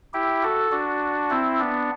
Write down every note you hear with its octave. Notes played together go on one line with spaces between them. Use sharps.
E4 G4
F#4 A4
D4 F#4
C4 E4
B3 D4